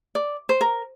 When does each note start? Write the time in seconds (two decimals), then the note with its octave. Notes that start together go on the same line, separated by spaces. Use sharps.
0.15 D5
0.49 C5
0.61 A#4